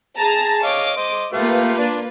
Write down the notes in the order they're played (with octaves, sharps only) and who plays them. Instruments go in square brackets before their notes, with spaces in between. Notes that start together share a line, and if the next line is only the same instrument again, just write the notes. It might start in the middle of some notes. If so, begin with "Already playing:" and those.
[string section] G#4 A5 A#5
[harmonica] C#5 D#5 F5 [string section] D6
[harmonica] C5 D#5
[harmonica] A3 G4 F5 [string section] A#3 F4 B4
[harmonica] D4 D5